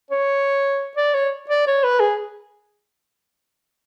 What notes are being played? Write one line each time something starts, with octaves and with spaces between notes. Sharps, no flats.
C#5
D5
C#5
D5
C#5
B4
G#4